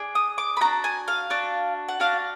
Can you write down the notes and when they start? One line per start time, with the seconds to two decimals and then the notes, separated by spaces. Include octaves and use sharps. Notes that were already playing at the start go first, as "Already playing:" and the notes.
Already playing: D4 G#4
0.15 D#6
0.38 D6
0.57 B5
0.61 D4 F#4 A#5
0.84 G#5
1.08 F5
1.30 D4 F#4
1.88 F#5
2.00 D4 F#4 F5